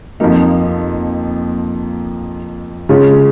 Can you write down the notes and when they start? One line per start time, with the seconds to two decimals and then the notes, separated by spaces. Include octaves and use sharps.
0.20 F2 F3 A#3 D#4
2.89 C#3 G#3 C#4 F4